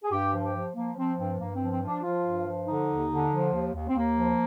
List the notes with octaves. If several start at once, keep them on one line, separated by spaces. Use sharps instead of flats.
G#4
G2 G4
F3
G4
F3
F3 A#3
F3 C4
G2 C4
G2 A#3
F3 C4
C4
F3
D4
F3 F4
G2
F3
D3 D#4
D#2
D3
F3
D#2
D#2
C4
D#2 A#3
F3